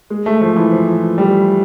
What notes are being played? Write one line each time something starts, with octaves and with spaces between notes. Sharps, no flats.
G#3
A3
F3
E3
F3
G3